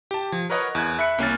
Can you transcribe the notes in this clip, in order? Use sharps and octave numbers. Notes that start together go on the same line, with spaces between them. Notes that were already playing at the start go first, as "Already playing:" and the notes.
G4 A5
F3
A#4 B4 C#5 D#5 F#5 A#5
E2 F#6 G#6
E5 B5 F#6 C#7
C2 A#3 C#4 G#5 F6 A6